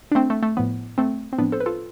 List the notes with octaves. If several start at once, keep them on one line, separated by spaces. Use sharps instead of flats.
D4
A3 C4
A3
A3
A2 F3 B3
A3 C4
C4
A2 F3 B3 D4
A4 C5
B4
F4 A4